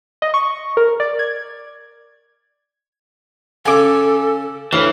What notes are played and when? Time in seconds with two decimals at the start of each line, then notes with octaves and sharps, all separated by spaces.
0.22 D#5
0.34 C#6
0.77 A#4
1.00 D5
1.19 G#6
3.66 C#3 A4 G#5 D6
4.73 D2 E3 C#5 F5